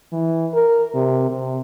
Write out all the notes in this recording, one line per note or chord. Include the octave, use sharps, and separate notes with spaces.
E3
A#4
C3
C3